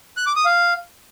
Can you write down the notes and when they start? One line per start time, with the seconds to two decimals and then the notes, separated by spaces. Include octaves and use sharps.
0.17 F#6
0.27 D6
0.36 D#6
0.45 F5